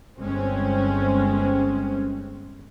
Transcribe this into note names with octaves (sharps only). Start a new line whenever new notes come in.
G1 G#3 C4 C#4